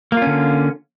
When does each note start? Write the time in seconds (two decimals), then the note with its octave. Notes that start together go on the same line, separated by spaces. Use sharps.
0.12 A#3
0.17 F4
0.22 C#4
0.27 D3